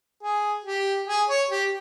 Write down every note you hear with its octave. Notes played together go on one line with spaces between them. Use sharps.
G#4
G4
G#4
C#5
G4